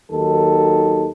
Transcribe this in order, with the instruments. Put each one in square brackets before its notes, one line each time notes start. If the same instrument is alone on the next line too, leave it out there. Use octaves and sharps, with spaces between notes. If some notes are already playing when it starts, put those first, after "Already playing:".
[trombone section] D#2 D#3 F#3 A4